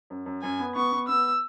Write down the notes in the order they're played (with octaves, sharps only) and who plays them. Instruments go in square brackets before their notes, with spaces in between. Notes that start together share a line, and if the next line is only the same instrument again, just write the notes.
[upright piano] F#2
F#2
[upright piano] F#2 [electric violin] G#5
[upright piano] B3
[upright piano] B3 [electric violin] C#6
[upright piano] B3
[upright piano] B3 [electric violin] E6